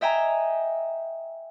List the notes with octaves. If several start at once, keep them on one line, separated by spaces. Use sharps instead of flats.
D#5 E5 G5 G#5 A#5